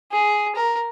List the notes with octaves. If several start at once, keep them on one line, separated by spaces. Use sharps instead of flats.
G#4
A#4